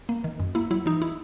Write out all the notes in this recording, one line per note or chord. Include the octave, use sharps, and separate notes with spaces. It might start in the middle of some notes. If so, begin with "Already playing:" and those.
A#3
D#3
F#2
A#3 E4
F#3 E4
E3 D#4
E4